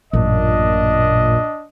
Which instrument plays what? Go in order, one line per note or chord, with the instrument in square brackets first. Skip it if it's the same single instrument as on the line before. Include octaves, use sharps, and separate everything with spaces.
[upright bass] A1 F#2 [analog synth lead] A#2 [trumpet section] D4 D#5